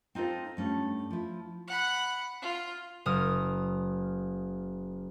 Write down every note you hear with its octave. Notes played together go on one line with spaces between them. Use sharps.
C4 D#4 F4 A4 C5
G2 A3 C#4
F3 E4
F#5 B5
F4
F#1 D#6 F6